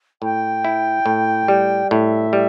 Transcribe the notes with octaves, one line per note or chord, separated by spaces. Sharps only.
A2 G5
E4
A2
G3
A2 E5
G3